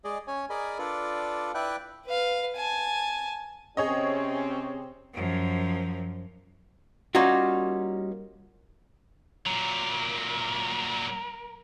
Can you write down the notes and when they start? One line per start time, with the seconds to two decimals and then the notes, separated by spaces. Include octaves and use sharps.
0.04 G#3 G#4 D5 D#5
0.28 C#4 C#5 G#5
0.50 G#4 A#4 D5 D#5 G#5 B5
0.79 D4 F4 A4 B4 D5
1.55 E4 B4 D5 E5 G5 F#6
2.06 B4 F5
2.56 G#5 A5
3.77 C3 C4 C#4 G#4 C#5 D#5
5.13 F#2 F3
7.15 G3 A#3 C#4 D#4 F4 F#4
9.46 A#2 F#3 A#4